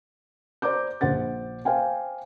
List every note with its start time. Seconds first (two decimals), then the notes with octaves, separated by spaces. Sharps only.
0.62 C5 D5 A#5 D6 G6
1.01 A#1 C5 F#5 A6
1.65 C5 F5 G5 G#5